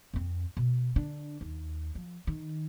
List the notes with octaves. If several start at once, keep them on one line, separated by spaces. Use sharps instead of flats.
F2 C4
B2
D3 D4
D#2
F3
D#3